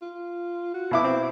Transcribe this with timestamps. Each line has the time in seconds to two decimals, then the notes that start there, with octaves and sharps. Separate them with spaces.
0.02 F4
0.74 F#4
0.91 B2 E4 D6
1.04 C4